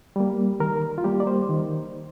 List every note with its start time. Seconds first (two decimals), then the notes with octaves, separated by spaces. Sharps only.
0.16 G3 A#3
0.60 D#3 A#4
0.98 F4
1.04 G3 A#3 G4
1.20 D5
1.27 C5
1.49 D#3